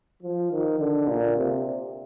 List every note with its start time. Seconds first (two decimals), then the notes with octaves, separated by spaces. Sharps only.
0.23 F3
0.51 D#3
0.80 D3
1.08 A#2
1.36 C3